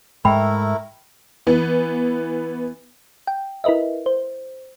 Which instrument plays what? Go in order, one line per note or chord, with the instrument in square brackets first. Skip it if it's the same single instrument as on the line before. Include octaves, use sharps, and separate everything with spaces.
[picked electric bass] G#2 G#3 [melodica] A3 E4 A#4 [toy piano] G5 B5
[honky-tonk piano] E3 B3
[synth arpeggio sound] G5
E4 A#4 B4 D#5 E5
C5